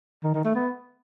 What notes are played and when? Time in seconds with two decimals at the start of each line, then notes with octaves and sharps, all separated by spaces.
0.24 D#3
0.34 D#3
0.45 A3
0.55 B3